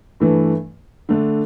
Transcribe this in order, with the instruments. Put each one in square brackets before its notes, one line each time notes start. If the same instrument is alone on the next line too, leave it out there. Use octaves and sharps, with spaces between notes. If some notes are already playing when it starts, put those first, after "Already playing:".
[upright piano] G2 E3 A3
D3 A3 D4